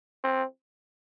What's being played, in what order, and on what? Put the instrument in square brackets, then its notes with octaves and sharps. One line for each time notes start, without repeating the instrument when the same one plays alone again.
[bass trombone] C4